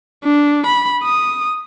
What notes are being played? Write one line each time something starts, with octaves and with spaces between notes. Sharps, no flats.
D4
B5
D#6